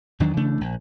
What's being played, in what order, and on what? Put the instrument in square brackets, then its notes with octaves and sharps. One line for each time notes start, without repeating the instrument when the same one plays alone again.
[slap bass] E2 D#3 F#3 D4
C#3 E3 A3 D4
A#1